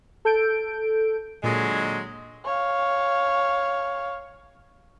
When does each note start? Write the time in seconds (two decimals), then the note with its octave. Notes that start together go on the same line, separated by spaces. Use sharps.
0.25 A4 G6 D7
1.43 A#2 D3 F#3 G#3
2.45 C#5 F5